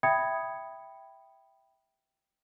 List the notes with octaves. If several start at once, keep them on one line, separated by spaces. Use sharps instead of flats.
E5 G5 B5 D#6 G#6 C#7